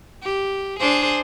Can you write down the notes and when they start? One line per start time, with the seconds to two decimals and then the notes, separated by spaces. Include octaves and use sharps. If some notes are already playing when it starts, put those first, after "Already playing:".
0.23 G4
0.80 D4 G#4 C5